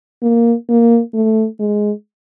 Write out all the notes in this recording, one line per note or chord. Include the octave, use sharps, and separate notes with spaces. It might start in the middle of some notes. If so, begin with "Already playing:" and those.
A#3
A#3
A3
G#3